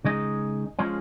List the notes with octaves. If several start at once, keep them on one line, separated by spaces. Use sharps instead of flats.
C#3 G#3 D#4 G#4 D#5
F3 G#3 C#4 G#4